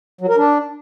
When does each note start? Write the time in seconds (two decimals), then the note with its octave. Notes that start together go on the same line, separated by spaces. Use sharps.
0.21 F#3
0.29 A#4
0.37 D4